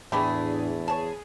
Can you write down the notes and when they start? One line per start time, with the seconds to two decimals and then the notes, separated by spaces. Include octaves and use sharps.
0.12 E2 A2 G#3 A3 D4 G4 G#4 B5
0.88 G#4 C#5 A5